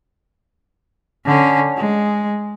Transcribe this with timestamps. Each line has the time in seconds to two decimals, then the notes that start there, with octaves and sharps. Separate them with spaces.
1.25 D3 C#4
1.76 G#3